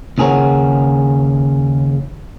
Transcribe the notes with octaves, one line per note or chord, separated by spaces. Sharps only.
D#2 C#3 G#4 A#4 C#5 F#5